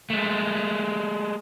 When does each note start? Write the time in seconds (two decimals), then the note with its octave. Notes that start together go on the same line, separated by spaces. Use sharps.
0.10 G#3 A3